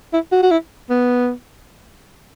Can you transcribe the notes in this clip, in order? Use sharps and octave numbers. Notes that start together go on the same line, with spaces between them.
E4
F#4
F#4
E4
B3